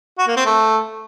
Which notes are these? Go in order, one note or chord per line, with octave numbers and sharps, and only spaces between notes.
F#4
A#3
C4
A3